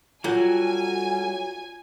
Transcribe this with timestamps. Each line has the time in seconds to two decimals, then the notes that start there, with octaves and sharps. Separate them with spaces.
0.24 F#3 G3 F4 A4 G#5 G6